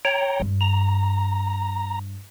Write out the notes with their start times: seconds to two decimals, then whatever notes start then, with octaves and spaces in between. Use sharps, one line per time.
0.05 C#5 G5 A#5
0.40 G2
0.61 A#5